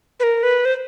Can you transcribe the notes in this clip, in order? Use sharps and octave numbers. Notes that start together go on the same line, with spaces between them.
B4
A#4
B4
C5